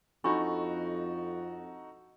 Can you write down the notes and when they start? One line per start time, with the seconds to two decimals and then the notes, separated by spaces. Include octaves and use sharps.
0.24 F2 D4 D#4 F#4 A4 B5 C#6